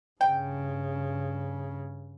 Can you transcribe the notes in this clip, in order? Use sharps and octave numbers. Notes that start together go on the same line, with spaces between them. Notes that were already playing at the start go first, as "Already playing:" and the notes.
G2 C#3 G5